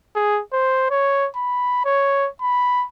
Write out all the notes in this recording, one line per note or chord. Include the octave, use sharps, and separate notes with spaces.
G#4
C5
C#5
B5
C#5
B5